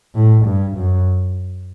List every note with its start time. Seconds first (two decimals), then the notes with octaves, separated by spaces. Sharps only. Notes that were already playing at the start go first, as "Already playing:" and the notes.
0.15 A2
0.45 G2
0.77 F#2